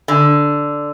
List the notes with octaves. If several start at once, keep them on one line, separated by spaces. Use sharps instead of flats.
D3